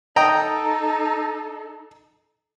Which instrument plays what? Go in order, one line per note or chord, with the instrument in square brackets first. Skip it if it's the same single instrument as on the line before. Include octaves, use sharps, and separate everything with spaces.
[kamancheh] D#4 A4 [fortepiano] D#5 G5 A#5